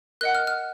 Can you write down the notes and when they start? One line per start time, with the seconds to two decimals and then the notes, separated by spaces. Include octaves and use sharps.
0.21 A#4 D#5 F#5 F#6
0.35 F6
0.47 F6